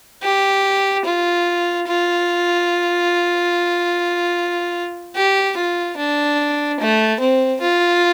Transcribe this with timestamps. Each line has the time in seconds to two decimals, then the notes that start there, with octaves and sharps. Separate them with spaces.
0.23 G4
1.06 F4
1.88 F4
5.15 G4
5.57 F4
5.98 D4
6.79 A3
7.20 C4
7.61 F4